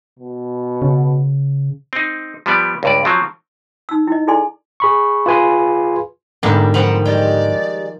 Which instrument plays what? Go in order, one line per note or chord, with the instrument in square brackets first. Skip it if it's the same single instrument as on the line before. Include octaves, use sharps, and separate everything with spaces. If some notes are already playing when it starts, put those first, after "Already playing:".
[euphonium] B2
[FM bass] C#3
[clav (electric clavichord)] C4 D#4
F3 G3 B3 D5
C#2 G2 D5
F3 F#3 C4
[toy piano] D#4 E6
E4 D#5
E4 G#4 A4 D5 G#5 C6
[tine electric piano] G#4 B5 C#6
F4 G#4 B4 G#5 B5 C6
[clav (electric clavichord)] G#2 D3 B3 [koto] G3 A#3 D4
[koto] D#3 F3 G3 [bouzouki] A#3 C4 [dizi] F#5
[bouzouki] D#3 G#3 G4 [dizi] D5 [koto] G5